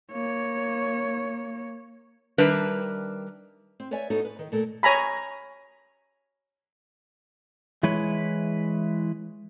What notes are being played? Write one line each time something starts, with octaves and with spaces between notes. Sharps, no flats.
A#3 C#5
D#3 G3 D4 A#4 B4 E5
C4
B4 C#5 D5 E5 G#5
B3 D#4 F#4 A4 C#5
B4
D#3
A#2 A3 A4 A#4
C#5 G#5 A#5 B5
E3 G#3 E4 B4 C#5